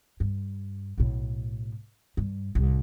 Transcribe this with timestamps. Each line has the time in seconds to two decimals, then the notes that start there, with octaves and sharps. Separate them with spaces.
0.20 G2
0.98 B1 A2
2.17 G2
2.55 C2 A2